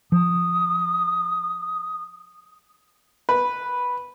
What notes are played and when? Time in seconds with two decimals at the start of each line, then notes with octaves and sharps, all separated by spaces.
0.12 F3 D#6
3.29 B4